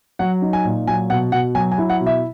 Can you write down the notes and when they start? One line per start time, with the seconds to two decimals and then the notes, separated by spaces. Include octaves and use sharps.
0.19 F#3 F#5
0.42 D#4
0.53 G#5
0.65 A#2
0.87 F#3 G#5
1.10 B2 F#5
1.32 B2 F#5
1.55 F#3 G#5
1.72 G#5
1.78 E4
1.90 F#5
2.00 B2
2.07 E5